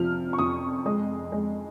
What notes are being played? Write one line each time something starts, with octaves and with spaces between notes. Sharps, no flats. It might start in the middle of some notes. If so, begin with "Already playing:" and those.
Already playing: F2 C3 F3 F6
C#6
F2 D#6
G#3 D#6
G#3